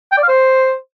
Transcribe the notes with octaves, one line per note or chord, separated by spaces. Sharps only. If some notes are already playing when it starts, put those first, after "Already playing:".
G5
D5
F5
C5